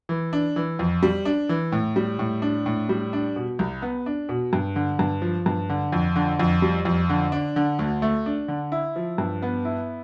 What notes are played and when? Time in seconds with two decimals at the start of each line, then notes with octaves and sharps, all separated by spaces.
0.09 E3
0.33 D4
0.56 E3
0.79 F2
1.03 G3
1.25 D4
1.49 E3
1.72 A2
1.96 G3
2.19 A2
2.42 D4
2.66 A2
2.89 G3
3.13 D4
3.36 B2
3.59 C2
3.82 B3
4.06 D4
4.29 B2
4.53 G2
4.76 D3
4.99 G2
5.22 F3
5.46 G2
5.70 D3
5.92 F2
6.16 D3
6.39 F2
6.62 G3
6.85 F2
7.09 D3
7.32 D4
7.56 D3
7.79 D2
8.02 A3
8.26 D4
8.48 D3
8.72 E4
8.96 F3
9.18 G2
9.42 B3
9.65 E4